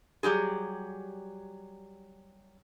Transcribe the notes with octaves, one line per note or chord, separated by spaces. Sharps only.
F#3 G3 G4 G#4